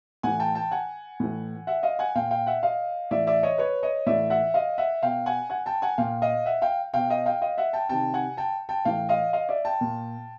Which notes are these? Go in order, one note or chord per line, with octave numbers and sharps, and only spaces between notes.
A2 E3 F#5 G#5
G5 A5
G5 A5
F#5 G#5
A2 E3
E5 F#5
D#5 F5
F#5 G#5
A#2 F5 G5
F5 G5
E5 F#5
D#5 F5
A2 E3 D5 E5
D5 E5
C#5 D#5
B4 C#5
C#5 D#5
A2 E3 D5 E5
E5 F#5
D#5 F5
E5 F#5
B2 F5 G5
F#5 G#5
F#5 G#5
G5 A5
F#5 G#5
A#2 F5 G5
D#5 F5
E5 F#5
F5 G5
B2 F5 G5
D#5 F5
F5 G5
D#5 F5
E5 F#5
G5 A5
C3 D#3 G5 A5
F#5 G#5
G5 A5
G5 A5
A2 E3 F5 G5
D#5 F5
D#5 F5
D5 E5
G5 A5
A#2